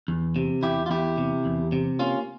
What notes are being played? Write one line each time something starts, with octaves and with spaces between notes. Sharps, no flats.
E2
C3
E2 E4 G4
F4
E2 E4 G4
C3
E2
C3
A#3 C#4 F4